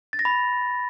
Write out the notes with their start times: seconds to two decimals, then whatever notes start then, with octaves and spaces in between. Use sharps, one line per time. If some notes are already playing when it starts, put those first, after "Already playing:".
0.13 A6
0.19 A#6
0.25 B5